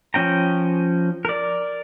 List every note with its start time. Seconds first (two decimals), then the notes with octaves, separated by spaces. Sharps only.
0.14 F3 C#4 G5 A#5
1.25 A#4 D5